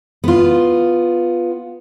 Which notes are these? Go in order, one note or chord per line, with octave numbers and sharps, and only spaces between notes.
B3 F4